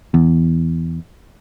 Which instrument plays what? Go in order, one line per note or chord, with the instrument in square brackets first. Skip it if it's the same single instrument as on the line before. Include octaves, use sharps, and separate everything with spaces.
[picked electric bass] E2